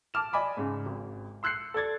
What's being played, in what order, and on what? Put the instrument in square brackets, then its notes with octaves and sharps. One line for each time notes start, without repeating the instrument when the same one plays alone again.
[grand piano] A5 D6 F6 E7
D5 D#5 G#5 B5 D6
G#2 C#3
G#1
C6 E6 F#6 G6 C7 C#7
A4 D5 G#6 A6